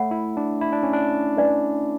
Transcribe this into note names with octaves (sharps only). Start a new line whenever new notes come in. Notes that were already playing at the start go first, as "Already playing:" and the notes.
Already playing: A3 C#5 F#5 B5
E4
D4
E4
D4
C#4
D4
B4 D5 G#5